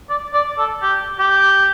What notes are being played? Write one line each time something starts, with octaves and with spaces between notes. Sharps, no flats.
D5
D5
A4
G4
G4